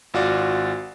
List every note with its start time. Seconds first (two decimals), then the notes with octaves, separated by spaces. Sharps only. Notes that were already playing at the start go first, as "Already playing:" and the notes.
0.14 G#1 F4 F#4 D5